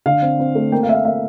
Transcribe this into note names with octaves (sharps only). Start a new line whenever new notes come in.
D3 F5
C4
C4
A3
A#3 G5
F5
A#3 E5
F5
A#3 E5